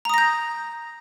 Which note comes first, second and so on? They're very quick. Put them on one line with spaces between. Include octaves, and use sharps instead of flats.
A#5 D#6 A#6 G6